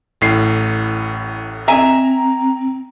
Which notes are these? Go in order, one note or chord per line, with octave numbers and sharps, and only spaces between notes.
A1 A2 C7
C4 E5 G#5 A#5